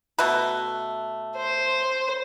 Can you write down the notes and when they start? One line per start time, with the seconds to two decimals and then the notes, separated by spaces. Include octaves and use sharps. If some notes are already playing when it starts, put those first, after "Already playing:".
0.19 B2 A3 B4
1.36 C5